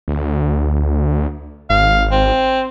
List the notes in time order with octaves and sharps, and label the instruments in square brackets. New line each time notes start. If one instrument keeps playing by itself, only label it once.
[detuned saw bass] D2
[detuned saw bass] G#1 [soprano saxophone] F5
[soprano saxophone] C4